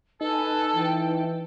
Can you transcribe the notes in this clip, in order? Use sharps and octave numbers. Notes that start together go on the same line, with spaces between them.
D#4 A4 B4 G#5 A5
E3 G5